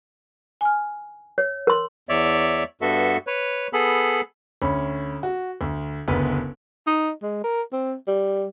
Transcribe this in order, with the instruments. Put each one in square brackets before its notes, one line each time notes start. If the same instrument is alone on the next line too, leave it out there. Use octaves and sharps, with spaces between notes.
[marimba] G#5 F6
[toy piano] C#5
A#4 C6
[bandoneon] E2 C#5 D5 E5
G2 B3 F#4 A4 E5
B4 C#5
B3 G#4 A4 B5
[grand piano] D2 C#4 B5
F#4
D2
F#1 D2 B3 B4
[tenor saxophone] D#4
G#3
A#4
C4
G3